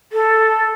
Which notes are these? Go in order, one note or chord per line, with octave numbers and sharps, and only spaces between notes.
A4